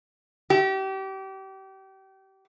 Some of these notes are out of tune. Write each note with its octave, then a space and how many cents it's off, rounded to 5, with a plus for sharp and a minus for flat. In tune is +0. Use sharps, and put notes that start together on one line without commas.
G4 -30